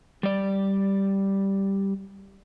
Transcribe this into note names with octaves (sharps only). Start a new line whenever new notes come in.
G3 D5